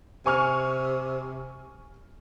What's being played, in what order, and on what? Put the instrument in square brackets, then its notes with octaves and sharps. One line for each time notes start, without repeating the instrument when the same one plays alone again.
[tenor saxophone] C3 [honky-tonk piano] G#5 C#6 F6